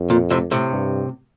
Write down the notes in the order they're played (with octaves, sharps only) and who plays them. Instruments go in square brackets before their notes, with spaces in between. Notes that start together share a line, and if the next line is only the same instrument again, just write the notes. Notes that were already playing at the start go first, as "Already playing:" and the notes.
Already playing: [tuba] F2
[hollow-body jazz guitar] A#2
A2 C3
A2 C3
[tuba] G2